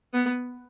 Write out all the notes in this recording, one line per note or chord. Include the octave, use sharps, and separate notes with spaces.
B3